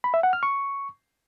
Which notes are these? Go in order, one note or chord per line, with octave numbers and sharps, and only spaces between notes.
B5
E5
F#5
F6
C#6